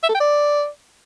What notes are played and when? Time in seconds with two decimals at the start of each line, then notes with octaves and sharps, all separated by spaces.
0.03 E5
0.09 A4
0.15 G5
0.20 D5